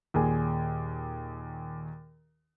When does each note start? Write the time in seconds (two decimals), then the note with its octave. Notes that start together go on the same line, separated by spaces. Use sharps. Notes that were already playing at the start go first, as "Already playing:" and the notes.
0.14 D#2 A#2 G#4 G#5